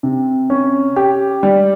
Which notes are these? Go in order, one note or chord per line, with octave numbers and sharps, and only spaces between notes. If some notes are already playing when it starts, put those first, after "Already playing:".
C3
C#4
G4
G3